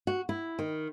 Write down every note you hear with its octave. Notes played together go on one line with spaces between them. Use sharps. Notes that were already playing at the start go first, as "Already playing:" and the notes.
F#4
E4
D#3